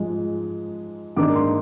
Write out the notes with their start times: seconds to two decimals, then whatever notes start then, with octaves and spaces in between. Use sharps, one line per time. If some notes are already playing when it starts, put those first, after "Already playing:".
Already playing: G#2 F3 G#3
1.16 G#2 D#3 A#3 D4 D6
1.36 C6